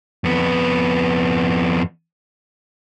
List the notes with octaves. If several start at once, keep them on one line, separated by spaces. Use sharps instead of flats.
F2 B3